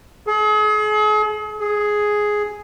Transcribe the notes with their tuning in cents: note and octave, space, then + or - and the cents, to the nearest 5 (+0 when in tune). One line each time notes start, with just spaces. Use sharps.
G#4 +40
G#4 +5